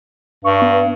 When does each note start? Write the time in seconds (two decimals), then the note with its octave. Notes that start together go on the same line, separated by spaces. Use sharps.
0.44 G2 C#6
0.62 B3